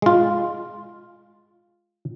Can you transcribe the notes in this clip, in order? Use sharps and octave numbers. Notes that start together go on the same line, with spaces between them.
G#3 F4